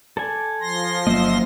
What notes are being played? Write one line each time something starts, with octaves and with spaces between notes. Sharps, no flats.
A4 D5 G#5
F3 C6 A#6
G1 F#3 A#3 D#5 E5